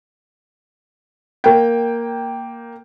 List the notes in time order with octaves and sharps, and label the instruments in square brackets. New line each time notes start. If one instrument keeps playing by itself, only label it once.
[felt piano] A#3 G5